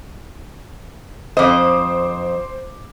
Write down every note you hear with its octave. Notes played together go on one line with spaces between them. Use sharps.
F2 C5 D#5 D6